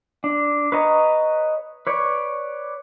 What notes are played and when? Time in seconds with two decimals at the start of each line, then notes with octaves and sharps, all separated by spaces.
0.24 D4
0.72 B4 C#5 D#5 A#5
1.87 B4 C#5 D5